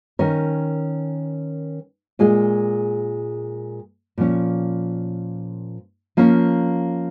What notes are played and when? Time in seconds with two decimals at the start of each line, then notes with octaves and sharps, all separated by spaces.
0.19 D#3 C#4 A#4 C#5
2.19 A#2 G#3 F4 G#4
4.18 A#2 F3 C#4
6.17 F3 A#3 C#4